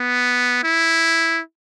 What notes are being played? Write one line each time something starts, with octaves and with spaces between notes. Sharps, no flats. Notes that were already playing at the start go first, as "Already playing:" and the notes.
Already playing: B3
E4